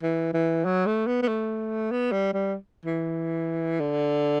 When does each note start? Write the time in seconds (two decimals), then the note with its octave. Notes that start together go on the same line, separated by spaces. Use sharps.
0.03 E3
0.33 E3
0.65 F#3
0.86 A3
1.07 B3
1.22 B3
1.28 A3
1.91 B3
2.12 G3
2.33 G3
2.86 E3
3.80 D3